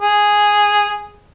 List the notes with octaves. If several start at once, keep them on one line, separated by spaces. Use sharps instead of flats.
G#4